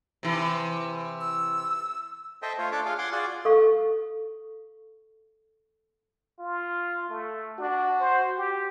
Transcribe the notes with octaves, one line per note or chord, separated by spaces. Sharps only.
C3 E3
E6
A4 C5 D#5 E5 G5
A3 F4 C5 C#5
D4 A4 C#5 A5 D6
F4 G#4 F5
F#5 G#5 C6 D6
F4 F#4 G#4 D5
A4 F5 C#6
F4
A3
D4 F#4
C5
G4